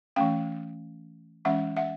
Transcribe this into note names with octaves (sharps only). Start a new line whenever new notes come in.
E3 A3 C#4 F5 G5
E3 G#3 C#4 E5 F#5
E5 F#5